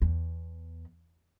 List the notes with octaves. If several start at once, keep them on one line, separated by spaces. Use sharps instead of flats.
E2